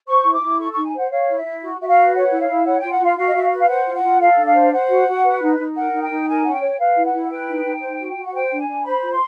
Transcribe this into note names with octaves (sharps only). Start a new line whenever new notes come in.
C5 C#6
E4
D6
E4
A4 C#6
D#4 C#6
G#5
C5 F#5
C#5 F5
E4
E5
E4
F#4
F#4 E5
F5
B4
C#5 F#5
E4
F5
E4
C#5 F#5
F4 G5
F#5
F4 F5
F#4 F5
D#5
F#4 E5
F5
B4
F5
C5 F#5
F4
F#5
F4
A4 F5
D4
F5
C5
C5 F#5
F#4
F#4
B4
D#4
D#4
A#4 F#5
D#4
G5
D#4
A#4 G#5
C#4 F#5
G5
C#5
B4 F5
E4
F#5
E4
B4 G5
D#4
D#4
C5
F#4
F#4
F#5
C5 G5
D4
G#5
D4
C5 B5
F4
C6